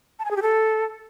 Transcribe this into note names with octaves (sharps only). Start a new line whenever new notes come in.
A5
G#5
G#4
G4
A4